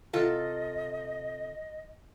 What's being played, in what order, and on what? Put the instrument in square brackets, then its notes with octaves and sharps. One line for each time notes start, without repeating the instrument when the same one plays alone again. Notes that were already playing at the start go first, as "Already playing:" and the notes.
[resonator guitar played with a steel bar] C3 F4 A4 [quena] D#5